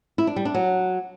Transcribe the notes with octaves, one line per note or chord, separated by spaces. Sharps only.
E4
D4
G3
D4
F#3